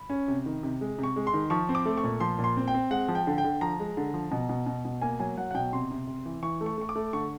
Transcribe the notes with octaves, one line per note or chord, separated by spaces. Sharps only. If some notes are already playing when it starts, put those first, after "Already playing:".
Already playing: B5
C#4
C3
D#3
C3
G#3
C3
C#6
G#3
C6
D#3
F3 C#6
C4
D6
A3
C#6
A#2
F3 C6
A#2
C6
C4
G5
C4
G#3 F#5
F3
G5
D3
G5
D3
F3 A#5
G#3
D3
F3
B2
B2
B2
B2
A#3 G#5
F#3 G#5
F#3 F#5
F#5
B2 G5
C3 C6
C3
C3
E3
E3 C#6
A3
C#6
A3 C#6
D6
A3
D3 C#6